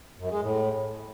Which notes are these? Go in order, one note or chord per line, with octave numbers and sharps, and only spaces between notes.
F#2
G#3
A2